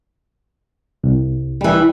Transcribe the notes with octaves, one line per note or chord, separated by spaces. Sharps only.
C2
E3 G3